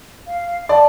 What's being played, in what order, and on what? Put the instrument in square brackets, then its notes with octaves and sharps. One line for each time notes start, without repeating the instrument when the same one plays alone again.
[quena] F5
[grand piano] D5 [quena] A5